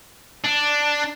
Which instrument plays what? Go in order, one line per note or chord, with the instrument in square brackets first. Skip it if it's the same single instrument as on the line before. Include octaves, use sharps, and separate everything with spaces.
[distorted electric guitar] D4